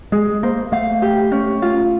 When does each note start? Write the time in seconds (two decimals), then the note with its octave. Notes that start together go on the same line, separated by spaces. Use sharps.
0.12 G#3 G#4
0.43 A#3 C5
0.72 A3 F5
1.02 G4
1.32 C#4
1.62 F4